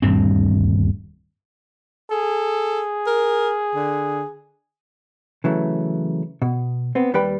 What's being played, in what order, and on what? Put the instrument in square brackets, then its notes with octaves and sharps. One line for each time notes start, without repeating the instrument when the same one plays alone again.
[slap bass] D#1 D2 G2 C4
[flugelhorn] G#4 [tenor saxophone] A4
[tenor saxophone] A#4
D3
[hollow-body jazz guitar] C#3 E3 F#3 A3
B2
B3 C4
D#2 G3 G4 B4 G5 B5